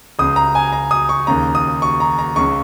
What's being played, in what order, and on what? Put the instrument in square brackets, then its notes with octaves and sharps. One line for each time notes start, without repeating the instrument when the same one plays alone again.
[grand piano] C#2 C#3 D#6
A#5
G#5
A#5
D#6
C#6
D#2 C#3 A#5
D#6
C#6
A#5
A#5
C#2 C#3 C#6